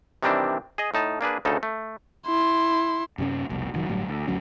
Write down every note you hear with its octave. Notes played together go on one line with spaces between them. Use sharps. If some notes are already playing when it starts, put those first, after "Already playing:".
C3 D#3 E3 G3 C4 D4
G#4 D#5
A2 D#4 A5
A#3 D4 G#4 B4
D2 C#3 D#4 A4
A3
E4 C6
F#2 C3 C#4
F1 C2 B2
F1 D#3 F#3
G1 A2 F#3 G3
D2
G#1 D2 F#3 C#4